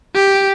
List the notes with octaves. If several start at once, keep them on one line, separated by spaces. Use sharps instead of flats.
G4